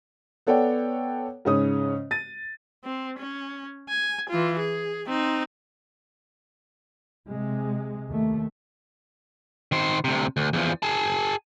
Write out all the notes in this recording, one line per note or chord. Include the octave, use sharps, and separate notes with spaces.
B3 A4 C#5 D5 F#5 G5
G#2 C#3 C#4 C#5 D#6
A6 D#7
C4
C#4
G#5
E3 F4
G#4
C4 D#4
C3 G#3
D#2 A3
D#3 C5
D2 C3
D2
E2 F3
G#4 A5